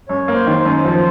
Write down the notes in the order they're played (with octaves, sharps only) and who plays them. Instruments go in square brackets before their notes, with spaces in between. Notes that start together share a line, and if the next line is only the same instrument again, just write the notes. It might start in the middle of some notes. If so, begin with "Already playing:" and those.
[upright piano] F#2 [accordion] C#5
[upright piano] A#3
[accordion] C5
[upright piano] D#3
[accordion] C5
[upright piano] F#2
[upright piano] F3 [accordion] C5